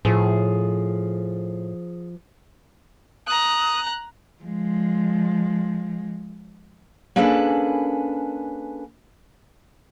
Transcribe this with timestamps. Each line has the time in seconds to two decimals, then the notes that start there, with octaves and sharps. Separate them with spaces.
0.05 A2 F3 G#4
3.27 A#5 D#6 F#6
4.43 F3 G#3
7.16 A#3 C#4 D4 G#4 A4 B4